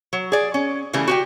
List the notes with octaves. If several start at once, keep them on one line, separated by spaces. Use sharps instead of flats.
F#3
G#4 D5
C#4
C#3 E3 G3 A3
F#4 G4 G5